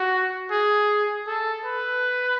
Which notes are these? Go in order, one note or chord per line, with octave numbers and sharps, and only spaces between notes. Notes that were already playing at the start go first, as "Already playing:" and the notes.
Already playing: F#4
G#4
A4
B4